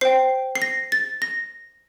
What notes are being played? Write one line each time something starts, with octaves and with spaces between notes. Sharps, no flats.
C5 G5 C7
C7
A#6
A6
A#6